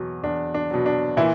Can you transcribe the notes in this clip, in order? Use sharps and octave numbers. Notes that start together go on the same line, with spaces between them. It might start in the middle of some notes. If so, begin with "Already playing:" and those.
Already playing: E2 B2 F#3
E2 D4
D4
B2 F#3
D4
A#2 E3 E4